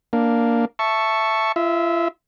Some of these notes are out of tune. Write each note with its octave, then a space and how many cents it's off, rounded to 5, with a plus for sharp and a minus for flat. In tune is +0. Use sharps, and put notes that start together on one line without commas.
A#3 +0 D4 +0
E5 +5 A5 +0 C#6 +0
F4 -40 E5 -20